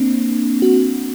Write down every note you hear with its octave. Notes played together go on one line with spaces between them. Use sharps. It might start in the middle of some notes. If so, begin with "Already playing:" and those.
Already playing: A#3 C4 D4
F#4